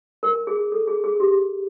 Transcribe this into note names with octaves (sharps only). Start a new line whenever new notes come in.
A#4
G#4
A4
G#4
G#4
G4